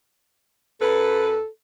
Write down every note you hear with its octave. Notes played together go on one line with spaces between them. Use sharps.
F#2 A4 B4